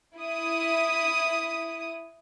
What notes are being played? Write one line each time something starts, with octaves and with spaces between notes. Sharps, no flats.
E4 D#6